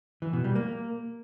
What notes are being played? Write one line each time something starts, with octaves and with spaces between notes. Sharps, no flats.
E3
B2
G3
A#3